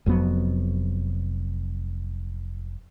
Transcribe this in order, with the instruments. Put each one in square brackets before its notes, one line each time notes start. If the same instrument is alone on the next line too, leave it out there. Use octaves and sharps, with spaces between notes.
[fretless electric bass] F1 F2 F#3 B3